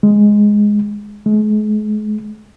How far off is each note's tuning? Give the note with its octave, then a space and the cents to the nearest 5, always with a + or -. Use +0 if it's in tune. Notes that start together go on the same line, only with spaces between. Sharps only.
G#3 +0
G#3 +40